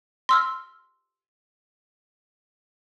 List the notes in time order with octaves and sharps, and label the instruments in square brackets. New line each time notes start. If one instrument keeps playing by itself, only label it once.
[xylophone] C6 E6 F6